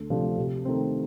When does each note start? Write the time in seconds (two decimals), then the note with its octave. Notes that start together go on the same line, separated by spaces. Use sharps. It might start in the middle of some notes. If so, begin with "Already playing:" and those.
Already playing: D2
0.10 C3 F3 A3 D4
0.37 C3
0.65 D#3 A3 C4